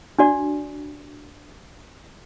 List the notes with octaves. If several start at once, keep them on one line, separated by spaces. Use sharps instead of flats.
D4 F#4 D5